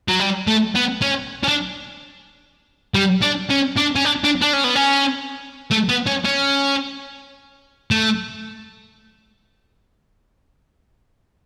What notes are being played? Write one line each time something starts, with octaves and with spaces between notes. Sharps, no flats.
F#3
G3
A3
B3
C#4
C#4
D4
G3
D4
C#4
D4
C#4
D4
D4
D4
C#4
B3
C#4
A3
B3
C#4
C#4
A3